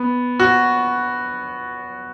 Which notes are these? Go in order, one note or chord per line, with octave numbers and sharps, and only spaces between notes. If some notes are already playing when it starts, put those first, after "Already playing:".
Already playing: B3
F#4